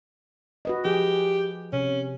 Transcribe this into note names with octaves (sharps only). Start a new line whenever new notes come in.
F#4 B4 D#5
F3 G4 G#4
C3 C#4